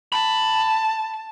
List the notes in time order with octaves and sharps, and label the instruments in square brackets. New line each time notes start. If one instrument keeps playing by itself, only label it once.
[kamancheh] A5 [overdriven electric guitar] B5